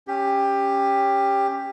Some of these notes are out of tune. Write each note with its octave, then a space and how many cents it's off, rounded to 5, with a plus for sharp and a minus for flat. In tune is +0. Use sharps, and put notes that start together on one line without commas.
C#4 +0 G4 +15